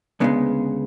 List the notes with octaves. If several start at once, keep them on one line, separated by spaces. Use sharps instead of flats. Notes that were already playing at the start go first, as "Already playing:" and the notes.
D2 C#3 G#3 B3